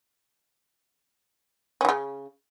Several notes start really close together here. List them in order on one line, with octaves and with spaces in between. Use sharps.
C#4 E3 C#3